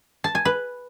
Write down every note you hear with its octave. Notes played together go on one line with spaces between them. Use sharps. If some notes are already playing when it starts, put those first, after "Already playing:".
A5
G#5
B4